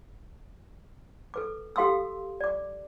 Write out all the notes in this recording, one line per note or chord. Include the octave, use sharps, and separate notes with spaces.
A4 B4 D6
G4 A4 F5 C6 D#6 E6
D5 D6